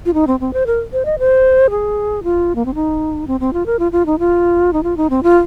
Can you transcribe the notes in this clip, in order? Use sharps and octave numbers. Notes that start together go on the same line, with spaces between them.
F4
D#4
C4
C4
C5
A#4
C5
D#5
C5
G#4
F4
A#3
C4
D#4
C4
C4
F4
A#4
F4
F4
D#4
F4
D#4
F4
D#4
C4
F4